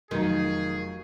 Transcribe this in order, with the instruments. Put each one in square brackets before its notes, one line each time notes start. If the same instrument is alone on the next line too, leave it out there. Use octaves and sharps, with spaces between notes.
[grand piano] F1 D#4 [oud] D#3 [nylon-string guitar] F3 F#3 [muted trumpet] G#4